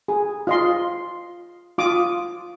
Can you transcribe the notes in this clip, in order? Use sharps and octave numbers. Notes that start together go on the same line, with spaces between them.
G#4
F4 D#5 C6
F4 D6 D#6